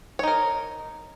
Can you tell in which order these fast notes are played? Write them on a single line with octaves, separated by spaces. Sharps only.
C#5 D#4 A#4